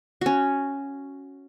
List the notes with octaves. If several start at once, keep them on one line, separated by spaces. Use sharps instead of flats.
C#4 F#4